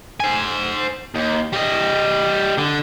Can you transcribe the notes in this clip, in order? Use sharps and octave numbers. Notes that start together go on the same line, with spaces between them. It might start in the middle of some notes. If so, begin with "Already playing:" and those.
C5 G#5
D#2
G3 D#5
D3